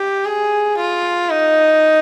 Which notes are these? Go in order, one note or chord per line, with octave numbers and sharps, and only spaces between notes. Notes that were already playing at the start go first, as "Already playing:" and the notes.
Already playing: G4
G#4
F4
D#4